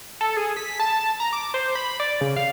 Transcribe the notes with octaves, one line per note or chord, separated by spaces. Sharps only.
A4
G#4
B6
A5
A#5
D6
C5
B5
D5
C#3
F5